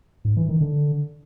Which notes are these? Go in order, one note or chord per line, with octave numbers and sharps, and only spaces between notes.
G#2
E3
D#3
D3